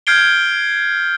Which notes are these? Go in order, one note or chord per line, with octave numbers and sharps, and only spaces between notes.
F6 G6 G#6 C7 D7 G7